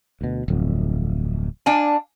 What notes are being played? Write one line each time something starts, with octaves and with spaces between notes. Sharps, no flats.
D2 B2
D1 F2
D4 F5 G#5